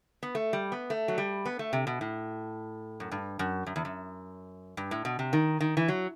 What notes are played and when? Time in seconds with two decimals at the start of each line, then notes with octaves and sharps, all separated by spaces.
0.23 B3
0.35 A3
0.53 G3
0.72 B3
0.90 A3
1.08 F#3
1.18 G3
1.45 B3
1.59 A3
1.73 C3
1.87 B2
2.01 A2
3.00 F#2
3.12 G2
3.39 F#2
3.67 F#2
3.76 E2
3.85 F#2
4.77 G2
4.91 A2
5.05 B2
5.19 C3
5.33 D#3
5.61 D#3
5.77 E3
5.88 F#3